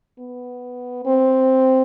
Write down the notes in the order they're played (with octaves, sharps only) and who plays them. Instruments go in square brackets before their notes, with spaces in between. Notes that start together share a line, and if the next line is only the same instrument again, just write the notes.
[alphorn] B3
C4